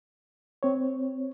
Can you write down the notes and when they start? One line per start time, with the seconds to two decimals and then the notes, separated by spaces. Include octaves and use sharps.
0.63 C4 C#5